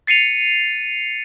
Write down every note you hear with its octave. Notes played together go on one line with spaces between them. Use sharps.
A6 C7 C#7 D#7 F7